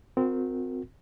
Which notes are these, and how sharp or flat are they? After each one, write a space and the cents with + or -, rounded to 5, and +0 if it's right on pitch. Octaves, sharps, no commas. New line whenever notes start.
C4 -20 F#4 -40 A#4 -15